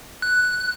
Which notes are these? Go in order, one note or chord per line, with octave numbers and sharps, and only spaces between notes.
F#6